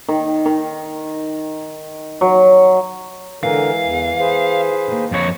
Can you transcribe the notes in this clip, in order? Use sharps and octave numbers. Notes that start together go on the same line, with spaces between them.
D#3
D#3
F#3
D3 E3 G#3 A#4 F5
E2
G#4 B4 C5
D#3 A#3
F2 C#5